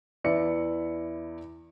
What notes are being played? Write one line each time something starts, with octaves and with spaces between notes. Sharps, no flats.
E2 E4 D5 E5 C#7